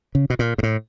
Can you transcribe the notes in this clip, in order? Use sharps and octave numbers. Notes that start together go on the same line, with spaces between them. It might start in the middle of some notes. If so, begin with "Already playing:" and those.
C#3
B2
A#2
G#2
A2